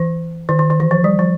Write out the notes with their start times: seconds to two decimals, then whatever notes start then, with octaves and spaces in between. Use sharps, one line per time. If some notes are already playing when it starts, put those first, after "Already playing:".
Already playing: E3
0.49 D#3
0.59 D#3
0.70 D#3
0.80 E3
0.91 F3
1.04 G3
1.19 F3